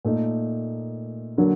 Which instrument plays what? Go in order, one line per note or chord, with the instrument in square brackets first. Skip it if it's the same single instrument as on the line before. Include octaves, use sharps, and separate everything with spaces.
[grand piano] A#2 A3 D#4
D3 F#3 A#3